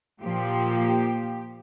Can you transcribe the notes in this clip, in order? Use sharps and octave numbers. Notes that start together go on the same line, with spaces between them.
A#2 F3 A#3 G4